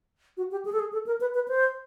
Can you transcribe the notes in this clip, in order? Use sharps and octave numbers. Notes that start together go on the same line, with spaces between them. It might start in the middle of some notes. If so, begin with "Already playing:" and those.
F#4
G4
G#4
A4
G#4
A4
A#4
B4
B4
C5